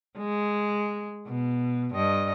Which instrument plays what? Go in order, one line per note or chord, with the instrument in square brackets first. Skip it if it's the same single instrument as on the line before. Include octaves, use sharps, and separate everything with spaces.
[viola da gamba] G#3
B2
G2 D#5